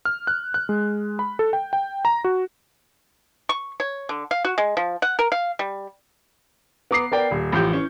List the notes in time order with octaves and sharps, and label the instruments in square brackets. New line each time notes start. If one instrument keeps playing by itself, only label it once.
[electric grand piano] F6
F#6
F#6
G#3
B5
A4
G5
G5
A#5
F#4
[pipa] C#6
C#5
D3
F5
F#4
G#3
F3
F#5
A#4
F5
G3
[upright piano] B3 A#5 D6 D#6 C7
B3 A#4 D5 G5
D#1
A1 F3 G4 G6
E3 C#4